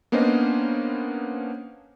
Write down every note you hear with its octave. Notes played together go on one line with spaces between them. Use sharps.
A#3 B3 C#4 D4 C5 D#5